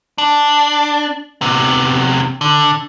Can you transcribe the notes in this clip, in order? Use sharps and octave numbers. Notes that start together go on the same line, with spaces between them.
D4
C3 B3
D3